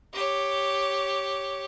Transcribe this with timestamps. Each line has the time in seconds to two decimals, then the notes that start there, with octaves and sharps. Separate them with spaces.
0.14 G4 C#5